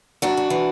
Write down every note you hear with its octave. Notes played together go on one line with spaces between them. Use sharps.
F#2 D4 F#4
F#2
E3